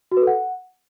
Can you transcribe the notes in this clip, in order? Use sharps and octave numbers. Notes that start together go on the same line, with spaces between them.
F#4
B4
A4
F#5